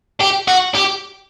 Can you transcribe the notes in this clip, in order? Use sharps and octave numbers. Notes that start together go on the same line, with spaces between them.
G4
F#4
G4